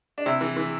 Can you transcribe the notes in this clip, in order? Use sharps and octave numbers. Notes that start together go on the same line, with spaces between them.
D4
C3 E4
E3
E3